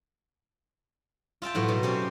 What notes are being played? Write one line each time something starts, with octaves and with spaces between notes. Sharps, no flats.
F4 E5 G5 A5
A2 F#3 B3
B2
C4 C#4 G4